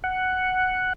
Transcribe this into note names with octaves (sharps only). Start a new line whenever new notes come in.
F#5